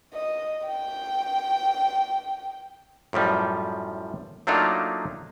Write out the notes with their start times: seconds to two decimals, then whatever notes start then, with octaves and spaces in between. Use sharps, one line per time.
0.13 D#5
0.67 G5
3.13 F#2 A2 F3 G3
4.47 F#3 A3 A#3 D4 D#4 F4